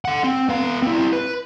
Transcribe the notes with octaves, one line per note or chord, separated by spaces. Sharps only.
A4 F#5
C4
B3 F5
C4 E4
B4